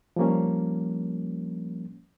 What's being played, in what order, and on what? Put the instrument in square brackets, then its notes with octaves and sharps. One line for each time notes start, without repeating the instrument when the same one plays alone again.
[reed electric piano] F3 G3 A#3 C#4